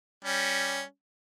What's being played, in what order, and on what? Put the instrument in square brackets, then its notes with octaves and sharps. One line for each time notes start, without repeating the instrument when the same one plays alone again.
[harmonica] G3 C#4